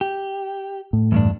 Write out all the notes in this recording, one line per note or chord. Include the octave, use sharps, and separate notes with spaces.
G4
A2
E2 G2 D4